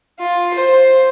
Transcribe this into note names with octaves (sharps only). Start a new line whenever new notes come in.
F4
C5